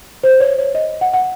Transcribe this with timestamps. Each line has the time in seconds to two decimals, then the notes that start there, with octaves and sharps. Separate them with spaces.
0.24 C5
0.40 C#5
0.58 C#5
0.75 D#5
1.01 F#5
1.14 F#5